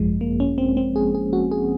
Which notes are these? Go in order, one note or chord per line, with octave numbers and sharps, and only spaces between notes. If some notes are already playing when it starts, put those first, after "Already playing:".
Already playing: G#1 F#2 F3 G#3
A#3
C#4
C4
C4
G#4
G#4
F#4
G#4